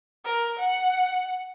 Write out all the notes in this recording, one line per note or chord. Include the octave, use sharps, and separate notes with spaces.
A#4
F#5